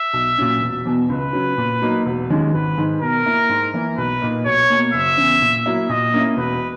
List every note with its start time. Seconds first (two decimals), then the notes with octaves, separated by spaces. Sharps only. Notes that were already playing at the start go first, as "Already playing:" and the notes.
Already playing: E5
0.14 B1
0.38 A#2 F#3 C#4
0.61 E1
0.86 E2 B2
1.09 C#2 B4
1.33 C#3 F#3
1.58 A#2
1.82 F#3 A#3 D#4
2.06 E1
2.30 D#2 D#3 G#3 C#4
2.53 G#1 B4
2.78 G#2 D#3
3.01 B2 A#4
3.25 A#3 E4
3.49 G#2
3.74 E3 A#3 E4
3.98 B1 B4
4.21 A#2 A#3 D#4
4.45 B1 C#5
4.70 B2 A#3
4.94 F#1 E5
5.17 E2 C#3
5.42 A#2
5.66 F#3 A#3 E4
5.89 A#2 D#5
6.14 A#3 C#4 E4
6.37 E1 B4